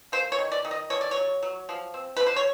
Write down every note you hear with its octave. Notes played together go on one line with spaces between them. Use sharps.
A#3 C5
C#5
D#3
D5
D#3
D#5
D3 C#5
D5
C#5
F#3
F#3
F3
C4
D3 B4
C5
C#5